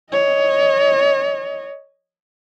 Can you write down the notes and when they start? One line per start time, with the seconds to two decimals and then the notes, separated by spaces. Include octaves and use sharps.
0.12 C#5 D#5